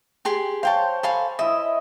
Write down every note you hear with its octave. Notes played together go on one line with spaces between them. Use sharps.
G4 G#4 C6
C5 C#5 F5 G5 A5
A4 F5 G#5 B5
E4 D#5 E5